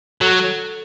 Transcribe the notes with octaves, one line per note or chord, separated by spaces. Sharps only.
F#3 A4